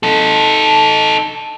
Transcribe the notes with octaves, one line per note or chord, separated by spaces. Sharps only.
D#4 A4